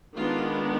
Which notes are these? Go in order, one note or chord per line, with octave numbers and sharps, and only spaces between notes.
D#3 G#3 B3 D4 F4